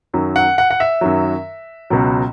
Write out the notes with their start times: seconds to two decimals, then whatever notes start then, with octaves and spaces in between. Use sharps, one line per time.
0.13 F#2 D#3 F#3
0.36 F#5
0.58 F#5
0.70 F#5
0.80 E5
1.01 F#2 D#3 F#3
1.90 C#2 B2 F#3